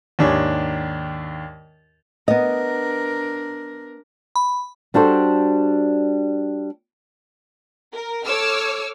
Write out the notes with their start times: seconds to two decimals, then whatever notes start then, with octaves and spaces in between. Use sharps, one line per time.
0.19 D#2 G#2 D4 G4 C#5 G#5
2.28 B3 D4 A#4 D#5
4.36 B5
4.94 G3 D4 F#4 A4 C5
7.92 A#4
8.25 A4 C#5 D6 E6 F6